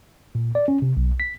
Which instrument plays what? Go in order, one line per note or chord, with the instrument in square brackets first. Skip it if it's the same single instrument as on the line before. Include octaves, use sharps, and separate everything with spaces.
[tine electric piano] A#2
D5
C#4
C3
B1
B6